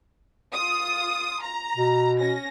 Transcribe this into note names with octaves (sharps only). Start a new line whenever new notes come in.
F4 D#6
A#5
B2
C#4 A#6